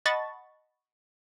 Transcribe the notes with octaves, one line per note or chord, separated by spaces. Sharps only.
D#5 F#5 A5 B5 C#6 A6